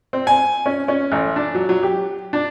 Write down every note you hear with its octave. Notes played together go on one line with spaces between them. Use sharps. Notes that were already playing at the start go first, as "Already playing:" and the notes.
C4
G#5
C#4
C#4
A1
D4
F#3
F#3
G4
D4